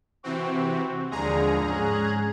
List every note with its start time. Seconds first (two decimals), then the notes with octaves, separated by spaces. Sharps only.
0.24 C3 E3 C4 F#4
1.11 D#2 D3 F3 G#3 G#4 A#5 D#6
1.68 G#2 C#4 F#6 G#6